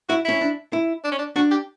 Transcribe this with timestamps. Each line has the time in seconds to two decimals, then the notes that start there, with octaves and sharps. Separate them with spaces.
0.09 E4 F#4
0.25 C#4 E4
0.41 D4
0.73 E4
1.04 D4
1.12 C#4
1.19 D4
1.36 D4 F#4
1.51 G4